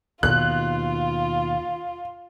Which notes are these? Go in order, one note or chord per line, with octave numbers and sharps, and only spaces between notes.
D#2 B2 F4 F#6